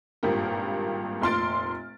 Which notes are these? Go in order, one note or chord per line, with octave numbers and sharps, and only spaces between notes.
G#1 G2 A#2 G3 G4 A#4
F1 A#2 C6 F6 A6 D7